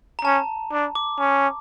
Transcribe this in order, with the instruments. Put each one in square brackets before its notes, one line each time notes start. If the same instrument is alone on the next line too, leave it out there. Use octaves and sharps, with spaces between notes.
[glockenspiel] A#5
[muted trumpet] C#4 [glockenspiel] A5
[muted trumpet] D4
[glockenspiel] D6
[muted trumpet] C#4